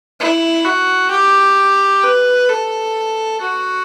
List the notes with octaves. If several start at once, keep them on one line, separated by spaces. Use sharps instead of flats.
E4
F#4
G4
B4
A4
F#4